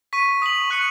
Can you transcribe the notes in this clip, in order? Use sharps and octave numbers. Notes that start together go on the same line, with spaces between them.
C#6 B6 D#7
D#6 B6 F#7
C#6 F#6 C#7 F#7